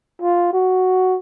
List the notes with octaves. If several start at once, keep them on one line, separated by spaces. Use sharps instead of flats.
F4
F#4